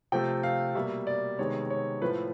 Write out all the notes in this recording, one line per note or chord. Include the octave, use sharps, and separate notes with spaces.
C3 F3 A3 G5
F5
B2 G3 A#3 E5
D5
C3 D#3 G#3 B3 C#5
C#5
A2 F3 A3 B4